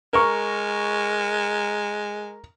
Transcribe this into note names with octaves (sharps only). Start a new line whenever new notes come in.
G#3 A#4 C#6